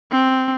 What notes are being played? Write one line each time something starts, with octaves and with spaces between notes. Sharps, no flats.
C4